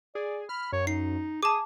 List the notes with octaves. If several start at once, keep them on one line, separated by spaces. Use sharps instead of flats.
G#4 D5
B5 F6
F#2 C#5
D#4 C7
G#4 A5 D6 D#6